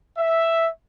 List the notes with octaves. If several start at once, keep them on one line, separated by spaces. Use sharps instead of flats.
E5